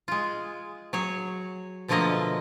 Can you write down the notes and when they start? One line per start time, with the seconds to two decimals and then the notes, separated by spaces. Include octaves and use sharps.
0.08 G#3 F4
0.93 F#3 G#4 C#5
1.88 B2 D3 F3 A3 A#3 D#5